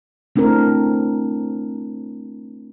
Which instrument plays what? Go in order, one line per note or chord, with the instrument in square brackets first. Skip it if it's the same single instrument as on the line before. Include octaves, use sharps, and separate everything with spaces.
[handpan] A3 C4 D4 E4 A#4